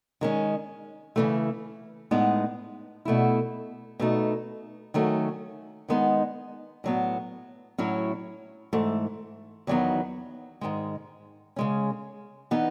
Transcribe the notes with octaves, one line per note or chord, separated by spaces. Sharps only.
D#3 G#3 C#4
C#3 E3 A3
A2 G#3 B3 D#4
B2 A3 E4
B2 A3 D#4
D#3 F#3 A3 C#4
D#3 G#3 B3 D#4
A2 F#3 B3
A2 F#3 C#4 E4
G#2 E3 A3
E2 D#3 F#3 B3 D#4
G#2 D#3 G#3
C#3 G#3 C#4
E3 B3 D#4